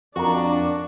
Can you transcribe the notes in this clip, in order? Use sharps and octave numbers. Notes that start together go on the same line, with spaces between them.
F2 D4 F#4 A#4